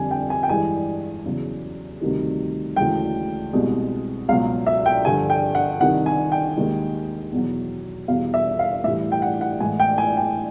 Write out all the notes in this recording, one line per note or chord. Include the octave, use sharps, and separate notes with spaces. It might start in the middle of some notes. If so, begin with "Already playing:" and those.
Already playing: F2 D3 G3 G#5
G5
G#5
G5
G2 E3 G#3 G#5
E2 C#3 F#3
D2 C3 D#3 G3
D2 C#3 E3 G#3 G5
C2 B2 G#3
C#2 B2 F#3 F5
E5
G5
G2 D3 F3 G#5
G5
F#5
C2 C3 D#3 F#5
G#5
G5
D#2 D#3 G#3
E2 B2 F#3
E2 B2 G3 F5
E5
F5
A2 E3 G3 E5
G5
F#5
F#5
A2 E3 G#3 G#5
G5
G#5
G5